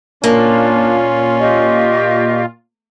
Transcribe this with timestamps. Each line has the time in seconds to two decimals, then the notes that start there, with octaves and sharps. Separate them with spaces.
0.24 A#2 A#3 C#4 D4 F4
1.39 G4 D#5 C#6